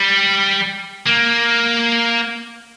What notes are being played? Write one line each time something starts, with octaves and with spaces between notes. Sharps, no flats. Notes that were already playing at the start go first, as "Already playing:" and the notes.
Already playing: G3
A#3